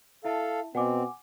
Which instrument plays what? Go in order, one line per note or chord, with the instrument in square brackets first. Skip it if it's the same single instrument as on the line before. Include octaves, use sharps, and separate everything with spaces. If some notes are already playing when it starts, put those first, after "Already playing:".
[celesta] E4 E5 A5 [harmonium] A4 F5
[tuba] B2 [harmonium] C4 [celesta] F#5 G#5 D6